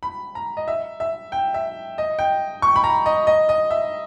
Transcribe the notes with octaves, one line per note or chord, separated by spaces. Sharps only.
B5
A#5
D#5
E5
E5
G5
E5
D#5
G5
C#6
B5
A#5
D#5
D#5
D#5
E5